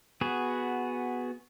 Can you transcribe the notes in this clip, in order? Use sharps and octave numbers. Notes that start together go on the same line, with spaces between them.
B3 F#4 G#4